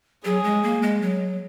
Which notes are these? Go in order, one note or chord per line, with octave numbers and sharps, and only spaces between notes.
F#3 G#4
G#3
A#3
G#3
F#3